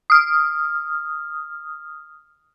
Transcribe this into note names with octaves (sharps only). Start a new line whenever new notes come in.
D#6 F6